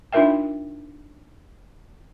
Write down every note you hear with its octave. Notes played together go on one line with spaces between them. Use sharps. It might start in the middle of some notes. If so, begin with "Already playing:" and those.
D4 D#4 F4 A#4 E5 G5